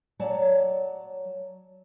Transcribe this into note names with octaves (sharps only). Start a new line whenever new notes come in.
F#3 C#5 D5 A5